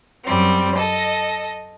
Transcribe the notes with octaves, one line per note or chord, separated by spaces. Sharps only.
F#2 G3 C4
A4 D#5